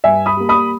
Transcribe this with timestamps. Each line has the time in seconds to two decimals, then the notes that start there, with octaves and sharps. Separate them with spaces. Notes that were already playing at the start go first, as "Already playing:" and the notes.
0.04 G2 E5 G#5
0.26 B5 D#6
0.37 G3 A#3
0.49 B5 D#6